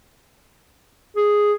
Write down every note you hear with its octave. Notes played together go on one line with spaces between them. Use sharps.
G#4